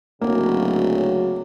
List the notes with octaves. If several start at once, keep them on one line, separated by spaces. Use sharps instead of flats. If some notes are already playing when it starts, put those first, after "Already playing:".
D1 C#3 F#3 A#3